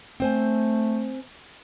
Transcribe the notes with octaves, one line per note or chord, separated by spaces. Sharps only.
A3 C4 C5 G#5